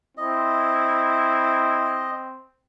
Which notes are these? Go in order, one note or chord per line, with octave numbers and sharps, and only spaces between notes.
C4 E4 D#5